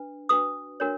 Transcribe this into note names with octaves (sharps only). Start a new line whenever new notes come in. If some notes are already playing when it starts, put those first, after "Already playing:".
Already playing: D4 B4
D4 F#4 B4 D#6
D4 F#4 A#4 C#5